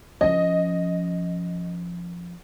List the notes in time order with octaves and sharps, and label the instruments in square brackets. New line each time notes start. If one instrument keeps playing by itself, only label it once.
[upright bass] F3 C#4 [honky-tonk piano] D#5